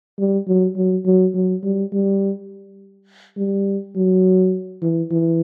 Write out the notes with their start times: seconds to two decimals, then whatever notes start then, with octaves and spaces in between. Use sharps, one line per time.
0.19 G3
0.48 F#3
0.77 F#3
1.06 F#3
1.35 F#3
1.64 G3
1.93 G3
3.38 G3
3.96 F#3
4.83 E3
5.12 E3